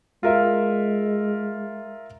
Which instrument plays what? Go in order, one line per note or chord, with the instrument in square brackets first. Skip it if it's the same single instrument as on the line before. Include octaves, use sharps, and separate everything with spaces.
[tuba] G#3 [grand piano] F4 A#4 E5